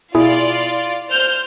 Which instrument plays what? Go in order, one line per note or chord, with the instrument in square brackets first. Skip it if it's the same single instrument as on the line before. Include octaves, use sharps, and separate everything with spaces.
[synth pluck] B2 E4 G#4 [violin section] F4 D5
[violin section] C5 F6 G6